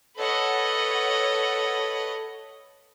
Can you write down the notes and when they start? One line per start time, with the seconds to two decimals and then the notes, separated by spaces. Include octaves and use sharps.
0.17 A4 B4 C#5 D#5 F#5